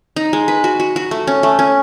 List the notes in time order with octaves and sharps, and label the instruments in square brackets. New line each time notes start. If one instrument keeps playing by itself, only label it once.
[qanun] D#4
G#3
B4
F#4
F#4
F#4
A3
C#4
A3
C#4